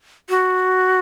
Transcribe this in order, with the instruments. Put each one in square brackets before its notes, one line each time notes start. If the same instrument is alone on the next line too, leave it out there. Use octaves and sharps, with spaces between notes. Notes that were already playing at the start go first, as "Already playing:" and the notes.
[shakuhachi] F#4